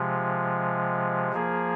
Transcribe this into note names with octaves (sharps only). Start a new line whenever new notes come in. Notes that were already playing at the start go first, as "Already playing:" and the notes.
Already playing: C3 F3 G#3
F3 A#3 G#4